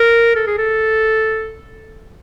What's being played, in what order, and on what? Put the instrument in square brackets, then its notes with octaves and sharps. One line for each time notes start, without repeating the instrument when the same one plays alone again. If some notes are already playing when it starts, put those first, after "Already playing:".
Already playing: [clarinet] A#4
A4
G#4
A4